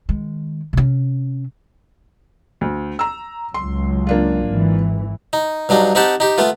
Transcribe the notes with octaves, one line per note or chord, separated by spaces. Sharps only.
D#3 G#3
C3 C#4
D2
A#5 E6
C#2 F#3 C6
A#3 D4 F4
G#1 E3
D#4
G2 F#3 D4 D#4
C4 D#4 G4 F#5 A5
D#4 G4
A3 B3 F4